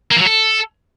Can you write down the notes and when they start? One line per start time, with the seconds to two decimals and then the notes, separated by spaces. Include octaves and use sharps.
0.11 A#3
0.16 E3
0.21 F#3
0.26 A4